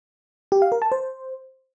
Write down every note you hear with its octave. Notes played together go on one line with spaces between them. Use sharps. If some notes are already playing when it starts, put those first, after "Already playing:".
G4
F5
A#4
A5
C5